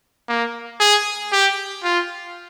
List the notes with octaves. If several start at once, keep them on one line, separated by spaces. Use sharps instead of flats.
A#3
G#4
G4
F4